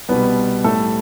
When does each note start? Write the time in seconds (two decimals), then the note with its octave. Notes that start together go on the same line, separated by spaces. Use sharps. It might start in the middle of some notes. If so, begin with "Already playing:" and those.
0.09 C2 B2 G3 B3 B4
0.64 A2 G3 A3 A4